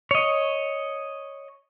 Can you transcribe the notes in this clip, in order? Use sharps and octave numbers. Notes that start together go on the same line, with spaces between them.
C#5 D#5